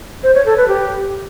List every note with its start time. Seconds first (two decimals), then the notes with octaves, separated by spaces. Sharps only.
0.23 C5
0.34 C#5
0.46 A4
0.57 B4
0.68 G4